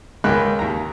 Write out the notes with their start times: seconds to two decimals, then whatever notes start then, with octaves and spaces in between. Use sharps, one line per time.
0.24 C#2 D#3 G#3 D#4 B5 F#6
0.59 D#2 A#5